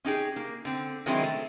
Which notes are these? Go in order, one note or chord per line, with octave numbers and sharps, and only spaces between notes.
C#4 D#4 G4 G#4
A#3
D3 C4
D#3 F#3 G#3 C4 D#4 E4
A3